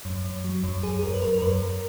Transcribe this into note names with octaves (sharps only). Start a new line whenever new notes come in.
F#2
F#2
F#3
F#2
F#2 G#4
G#4
F#2 A#4
B4
F#2 A#4
A#4
F#2 B4
F#2 A#4